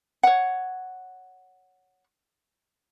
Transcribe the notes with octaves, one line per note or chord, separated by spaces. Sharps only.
C#5 F#5